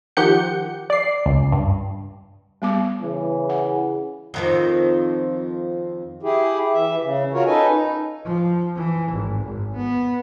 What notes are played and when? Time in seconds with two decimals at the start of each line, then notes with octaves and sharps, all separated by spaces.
0.17 D#3 F3 G4 F#5 G6 C#7
0.90 D5 C7
1.26 C#2
1.52 G2
2.62 G3 B3 D6
3.02 C#3 E3
3.50 F#5
4.34 F2 D#3 F3
6.23 E4 G4 G#4
6.73 E3 E5
7.01 C#3
7.33 F4 F#4 A#4 C#5
7.46 C#4 D#4 A4 B4 D#5 G#5
7.70 D#4
8.25 F3
8.76 E3
9.13 G#1
9.43 G#1
9.77 B3